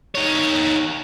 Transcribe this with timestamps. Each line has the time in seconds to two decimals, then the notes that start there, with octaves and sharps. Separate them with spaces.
0.15 D#3 C#5